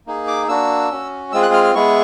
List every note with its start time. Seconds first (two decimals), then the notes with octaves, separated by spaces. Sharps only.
0.07 A#3 D#4 G#4
0.27 D6
0.48 A#3 D4 F#4 E6
0.91 C#4 F#4
1.32 G#3 C4 F4 G#4 E6
1.43 F#6
1.53 F6
1.64 F6
1.75 G#3 B3 E4 G#4 C#6